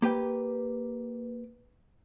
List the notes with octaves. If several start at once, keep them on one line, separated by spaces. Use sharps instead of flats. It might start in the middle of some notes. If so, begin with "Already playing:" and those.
A#3 G4 B4 G5